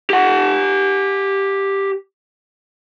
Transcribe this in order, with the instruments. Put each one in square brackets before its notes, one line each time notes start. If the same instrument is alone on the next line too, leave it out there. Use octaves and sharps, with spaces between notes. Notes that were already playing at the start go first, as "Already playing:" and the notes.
[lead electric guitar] G4 F#5